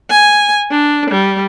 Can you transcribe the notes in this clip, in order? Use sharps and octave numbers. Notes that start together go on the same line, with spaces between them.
G#5
D4
G3